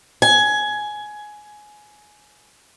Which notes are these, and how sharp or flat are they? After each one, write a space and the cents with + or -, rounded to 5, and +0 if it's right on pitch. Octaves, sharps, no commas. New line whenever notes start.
G#5 +15